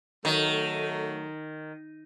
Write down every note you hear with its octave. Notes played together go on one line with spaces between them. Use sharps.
D#3 F#3 A3